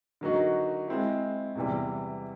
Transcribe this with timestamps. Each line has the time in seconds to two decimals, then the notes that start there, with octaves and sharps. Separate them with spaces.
0.21 D3 F#3 A#3 D#4 F#4
0.88 G#3 C4 E4
1.55 E2 C3 E3 G3